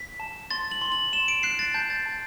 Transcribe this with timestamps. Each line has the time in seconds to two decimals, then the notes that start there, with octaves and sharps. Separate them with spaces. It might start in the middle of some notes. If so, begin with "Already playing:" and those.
Already playing: B6
0.20 A5
0.51 C6 A6
0.71 F#7
0.82 C6
0.92 F#7
1.13 C6 E7
1.28 D7
1.43 F#6 C7
1.59 A6
1.74 A5 G6
1.90 A6
2.06 A5